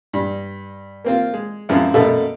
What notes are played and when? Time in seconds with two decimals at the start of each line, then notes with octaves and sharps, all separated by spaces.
0.14 G2
1.04 A#3 C4 F4
1.34 G#3
1.69 F#2 E3 F3 G#3 C4 E4
1.94 F#2 B2 A3 A#3 A4 E5